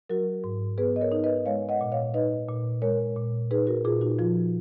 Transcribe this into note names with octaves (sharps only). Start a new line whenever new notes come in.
F#3 F#4 A#4
G#2
B3 G#4 B4
D#5
A#4 C#5
D#4
B4 D#5
G#3 C#5 F5
D#5 F#5
A#2
C#5 F5
D#4 B4 D#5
A#2
G#3 A#4 C#5
A#2
D#4 G#4 B4
F#4 A#4
A#2 F4 G#4
D#4 F#4
F3 F4